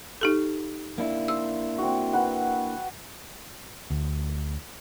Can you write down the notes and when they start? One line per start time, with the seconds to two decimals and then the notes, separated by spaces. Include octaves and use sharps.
0.21 D#4 G4 A4
0.98 A#3 D4 E4
1.28 C5 E6
1.78 C4 F#4
2.13 B4 F#5
3.91 D2